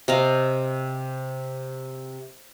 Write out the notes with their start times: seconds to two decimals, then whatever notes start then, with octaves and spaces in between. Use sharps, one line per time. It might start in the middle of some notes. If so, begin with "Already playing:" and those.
0.08 C3 D#5 F5